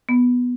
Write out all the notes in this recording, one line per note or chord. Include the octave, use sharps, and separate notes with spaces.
B3